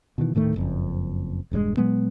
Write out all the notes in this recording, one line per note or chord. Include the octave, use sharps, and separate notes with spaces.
B2 D#3 E3
D#1 A2 D#3 A3
F#1 F2
E1 G2 B2 G#3
A#2 F#3 G#3 B3